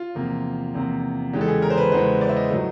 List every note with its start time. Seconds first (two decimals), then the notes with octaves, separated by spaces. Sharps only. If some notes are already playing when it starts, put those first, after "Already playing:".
Already playing: F4
0.15 E2 C3 F3 A#3
0.74 E2 C3 F3 A#3
1.33 E2 C#3 E3 G#3 G4
1.41 A4
1.48 G#4
1.62 A#4
1.70 C5
1.78 B4
1.92 E2 C#3 E3 G#3 C5
2.21 D5
2.29 E5
2.36 D#5
2.51 A2 F#3 A3